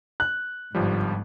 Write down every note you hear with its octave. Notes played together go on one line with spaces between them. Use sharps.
F#6
G1 G#2 F3 G3